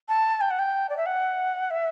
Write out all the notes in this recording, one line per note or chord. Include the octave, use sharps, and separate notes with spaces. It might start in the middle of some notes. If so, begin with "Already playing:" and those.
A5
G5
F#5
G5
D5
E5
F#5
E5